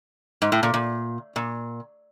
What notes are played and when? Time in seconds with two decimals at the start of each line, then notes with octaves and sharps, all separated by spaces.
0.42 G#2
0.52 A2
0.63 A#2
0.74 A#2
1.36 A#2